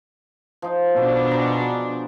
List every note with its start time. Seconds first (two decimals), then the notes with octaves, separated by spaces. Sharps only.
0.62 F3 D#4
0.97 B2 D4 A4
1.31 G#4 C5 A#5